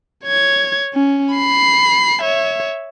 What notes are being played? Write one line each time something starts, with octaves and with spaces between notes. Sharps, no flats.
C#5 G#6
C#4
B5 C7
C#5 E5